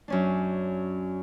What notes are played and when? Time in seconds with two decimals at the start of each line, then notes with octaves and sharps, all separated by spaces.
0.08 F#2 C#4 D4